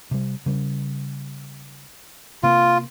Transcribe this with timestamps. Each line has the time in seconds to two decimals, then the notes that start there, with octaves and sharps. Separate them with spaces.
0.11 C3 G3
0.46 C#3 G3
2.43 C3 A#3 F4